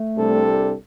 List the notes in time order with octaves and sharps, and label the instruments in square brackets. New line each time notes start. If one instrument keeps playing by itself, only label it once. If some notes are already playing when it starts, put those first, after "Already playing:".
Already playing: [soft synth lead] A3
[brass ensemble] C2 C3 G3 D4 A4